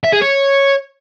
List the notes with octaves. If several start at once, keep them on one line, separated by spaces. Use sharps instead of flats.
E5
G#4
C#5